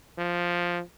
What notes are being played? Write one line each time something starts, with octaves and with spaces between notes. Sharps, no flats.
F3